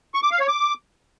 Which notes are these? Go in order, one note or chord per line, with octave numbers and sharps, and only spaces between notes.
C#6
D6
F5
C#5
D6